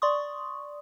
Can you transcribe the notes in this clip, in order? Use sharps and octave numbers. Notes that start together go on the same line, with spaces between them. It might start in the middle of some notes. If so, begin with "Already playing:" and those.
D5 C6 C#6 D#6